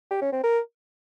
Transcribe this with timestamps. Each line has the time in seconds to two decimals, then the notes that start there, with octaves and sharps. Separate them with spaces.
0.11 G4
0.22 C#4
0.33 C4
0.43 A#4